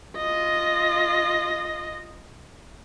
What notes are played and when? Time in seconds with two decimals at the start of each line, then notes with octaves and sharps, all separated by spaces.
0.17 F4 D#5